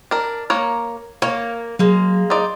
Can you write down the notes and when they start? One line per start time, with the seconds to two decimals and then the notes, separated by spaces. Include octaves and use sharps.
0.11 D4 A#4
0.50 A#3 A#4 C#5
1.22 A#3 C#5
1.79 F#3 G#3 A#3
2.30 D#4 D5 C6